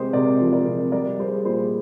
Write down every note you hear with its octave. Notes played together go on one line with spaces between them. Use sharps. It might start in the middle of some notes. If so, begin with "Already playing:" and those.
Already playing: C3 G#3 G4 G#4 A#4 C5
C3 A#4 D5
F3
A#4 D5
C3
G3 A#4 D5
G3 G#4 C5
A#2 G#4 C5